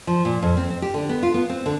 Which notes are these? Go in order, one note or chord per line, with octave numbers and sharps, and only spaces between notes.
F3
A#2
F2
C4
C4
G4
D3
B3
F4
B3
C4
D3